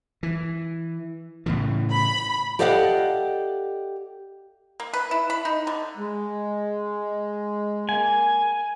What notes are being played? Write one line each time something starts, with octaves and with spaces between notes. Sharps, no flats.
E3
A2 C#3 E3
B5
G4 A4 D5 D#5 F5 F#5
A#3
B4
E4
B5
D#4
D3
G#3
A#3 G#5